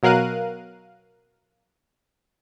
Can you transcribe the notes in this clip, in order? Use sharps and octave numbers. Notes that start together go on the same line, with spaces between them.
B2 F#3 A#4 F5 F#6 D#7